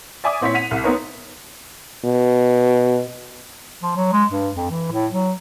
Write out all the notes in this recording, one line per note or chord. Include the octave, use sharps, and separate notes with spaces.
D5 E5 G#5 D6 D#6
A#2 C4 E4 C#5 B6
F#5 B6 D#7 F7
C2
B3 C4 D#4 A#4 B4 C#5
B2
F3
F#3
G#3
G2
F2
E3
A2
F#3